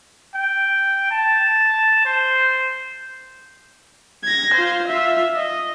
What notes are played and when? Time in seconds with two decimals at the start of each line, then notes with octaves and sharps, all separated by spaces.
0.35 G5
1.11 A5
2.05 C5
4.24 G#6 A#6
4.54 F4 C5
4.88 F4 E5
5.36 D#5